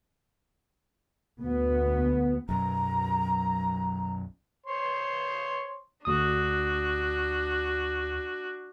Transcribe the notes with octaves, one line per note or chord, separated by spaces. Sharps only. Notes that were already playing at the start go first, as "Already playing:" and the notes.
D2 B3
B1 F#2 A#5
C5 C#5 C6
D2 D4 F#4 D#6